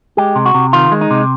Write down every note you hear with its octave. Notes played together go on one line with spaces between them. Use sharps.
G#3 G4
C3
F#4
C3
D#3 F4
G#3
D#4
C3